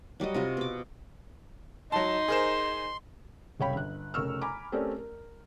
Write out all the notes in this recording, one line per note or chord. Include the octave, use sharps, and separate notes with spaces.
F#3 G3 F#4 D#5
C3 F4 F#4
B2 D6
F#3 D#4 A5 C6
G#4 A#4 C5
F#1 C2 C#5 F5 G5 B5
G1 F#6
F1 C#3 A#4 C#6 E6 F6
G#5 A#5 B5 D6
A3 C4 C#4 G4 A#4 D5
A#4